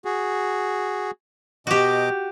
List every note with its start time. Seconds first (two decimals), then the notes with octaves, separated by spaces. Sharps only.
0.05 F#4 G#4
1.67 B2 F#4 G4 D#5 D6